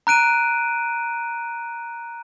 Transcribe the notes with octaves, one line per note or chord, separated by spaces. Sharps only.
A#5 F#6 D7 D#7